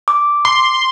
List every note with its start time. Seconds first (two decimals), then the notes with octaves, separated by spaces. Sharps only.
0.08 D6
0.45 C6